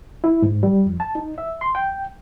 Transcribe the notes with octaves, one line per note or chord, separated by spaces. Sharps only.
E4
G#2
G3
F2
A5
D#4
E5
C6
G5